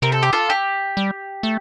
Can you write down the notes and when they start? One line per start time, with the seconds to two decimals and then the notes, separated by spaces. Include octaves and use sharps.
0.02 C3 A#4
0.12 A4
0.23 G4
0.33 F4 A4
0.50 G4
0.97 G3
1.43 A3